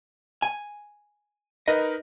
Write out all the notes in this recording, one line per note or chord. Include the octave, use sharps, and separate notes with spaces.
G#5
D#4 A#4 B4 D#5